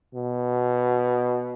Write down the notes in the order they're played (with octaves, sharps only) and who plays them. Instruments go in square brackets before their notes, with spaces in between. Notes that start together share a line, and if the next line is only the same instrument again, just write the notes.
[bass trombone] B2